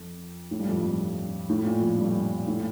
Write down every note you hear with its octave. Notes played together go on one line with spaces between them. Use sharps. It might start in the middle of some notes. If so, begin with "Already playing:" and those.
Already playing: F2
A2
G2
F2
G2
A2
A#2
F2
G2
A2